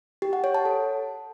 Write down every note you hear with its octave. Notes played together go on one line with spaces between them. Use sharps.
G4
F#5
C#5
A5
A4